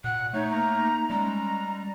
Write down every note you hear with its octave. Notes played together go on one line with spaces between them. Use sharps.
A#2 F#5 F#6
A3 D#4 C#5
A#3 A#5
G3 G#3 C#4 A#5